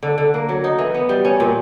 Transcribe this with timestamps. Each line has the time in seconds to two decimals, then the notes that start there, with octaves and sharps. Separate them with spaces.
0.03 D3
0.18 D3
0.34 A#3
0.49 F#3
0.64 D#4
0.79 E3
0.95 B3
1.09 G3
1.25 C#4
1.40 A#2